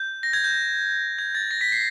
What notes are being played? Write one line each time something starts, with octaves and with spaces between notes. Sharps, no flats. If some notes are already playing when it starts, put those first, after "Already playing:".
Already playing: G6
A#6
G#6
G6
G#6
A6
A#6
B6
C7